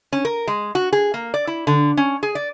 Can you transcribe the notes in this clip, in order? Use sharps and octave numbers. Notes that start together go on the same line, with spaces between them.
C#4
A#4
G#3
F#4
G#4
A#3
D5
E4
D3
C#4
G#4
D5